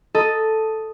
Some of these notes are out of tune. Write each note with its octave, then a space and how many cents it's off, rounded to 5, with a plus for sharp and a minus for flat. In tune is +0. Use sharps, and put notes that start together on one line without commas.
A4 +0 D#5 +0 A#5 -10